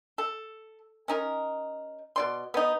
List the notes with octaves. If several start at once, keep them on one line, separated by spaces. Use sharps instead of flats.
A4
C#4 D#4 A#4
B2 D5 C6
B3 D#4